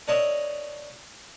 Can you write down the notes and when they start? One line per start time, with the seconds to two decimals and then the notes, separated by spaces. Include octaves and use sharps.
0.08 D4 A#4 C#5 D#5 E5